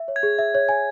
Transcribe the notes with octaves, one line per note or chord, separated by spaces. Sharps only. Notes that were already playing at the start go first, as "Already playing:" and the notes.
Already playing: E5
C#5
G#6
G#4
E5
C#5
G#5